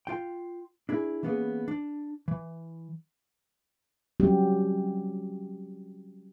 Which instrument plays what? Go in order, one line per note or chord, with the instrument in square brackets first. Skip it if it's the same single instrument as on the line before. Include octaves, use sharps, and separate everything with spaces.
[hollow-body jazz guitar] F4 G5
D4 E4 G#4
E3 A#3 B3 C#4 G#4
D4
E3
[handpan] F#3 G3 C4 C#4 F#4 G4